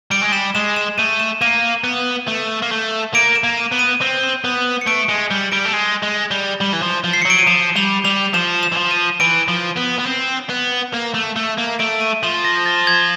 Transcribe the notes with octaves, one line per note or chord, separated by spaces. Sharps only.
G3 D7
G#3
G3 E7
G#3 E7
E7
A3 D#7
E7
A#3 D#7
B3
A3
A#3
A3
A#3 D7
E7
A#3
D#7
B3
D#7
C4
B3
C#7
A3 D7
G#3 C#7
G3
G3 D7
A3
G#3
G#3
G3
G3
E3
F3
F3
C7
C#7
F#3 D7
D#7
F3 E7
G3 F7
G3 F7
F3 E7
E7
E3
F3
D#7
E3 D7
F3
B3
B3
C4
B3
A#3
A3
A3
A#3
A3 D7
D#7
F3 E7
A#6
A6
G#6